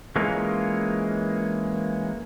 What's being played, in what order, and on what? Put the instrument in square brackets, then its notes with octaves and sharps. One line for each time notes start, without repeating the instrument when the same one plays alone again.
[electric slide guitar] E3 G#3 A#3 C#4 F4